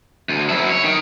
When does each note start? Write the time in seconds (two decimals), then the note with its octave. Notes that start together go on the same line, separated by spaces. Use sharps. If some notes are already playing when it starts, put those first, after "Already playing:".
0.29 D2
0.49 F#2 E4
0.70 C#5
0.84 D#3